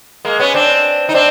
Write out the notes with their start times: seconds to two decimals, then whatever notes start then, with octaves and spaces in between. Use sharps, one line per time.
0.25 G#3 A#3
0.39 B3 C#4
0.54 C4 D4
1.09 D#4
1.14 C4 D4